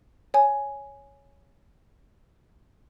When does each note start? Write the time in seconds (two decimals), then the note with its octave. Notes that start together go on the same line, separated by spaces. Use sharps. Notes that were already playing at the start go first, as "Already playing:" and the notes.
0.34 C#5 G#5